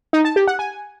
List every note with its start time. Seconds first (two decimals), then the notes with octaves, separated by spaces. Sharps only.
0.13 D#4
0.25 A5
0.36 G4
0.47 F#5
0.59 G#5